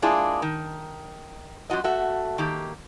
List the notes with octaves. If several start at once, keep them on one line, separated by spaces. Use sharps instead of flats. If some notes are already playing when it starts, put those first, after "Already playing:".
G#3 A#3 D4 E4 F4 G#4
D#3
F#2 F4 F#4 D#5
A3 F#4 E5
D#3 A#3 G4